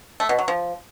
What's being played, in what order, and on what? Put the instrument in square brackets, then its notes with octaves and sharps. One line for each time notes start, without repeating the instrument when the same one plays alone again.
[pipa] A3
B2
F#3
F3